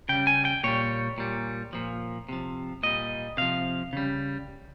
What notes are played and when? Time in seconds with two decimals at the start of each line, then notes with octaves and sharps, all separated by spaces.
0.09 C#3 G3 G5
0.27 G#5
0.45 G5
0.64 A#2 G3 C#5
1.18 A#2 G3
1.73 A#2 F3
2.29 C3 F3
2.83 A#2 G3 D#5
3.37 C3 F3 F5
3.93 C#3 G3